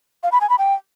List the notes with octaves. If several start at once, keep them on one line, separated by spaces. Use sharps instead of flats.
F5
B5
G#5
B5
G5